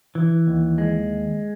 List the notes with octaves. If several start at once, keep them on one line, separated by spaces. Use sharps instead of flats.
E3
D#2
G#3